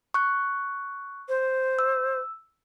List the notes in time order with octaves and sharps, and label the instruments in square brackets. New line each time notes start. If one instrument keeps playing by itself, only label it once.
[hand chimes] C#6 F#6
[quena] C5
[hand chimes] E6